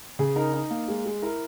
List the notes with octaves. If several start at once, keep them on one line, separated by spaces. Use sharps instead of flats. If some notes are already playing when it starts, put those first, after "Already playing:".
C#3 G#4
D#4 A#4
D#4
A#3
G#3
G#3
E4 A#4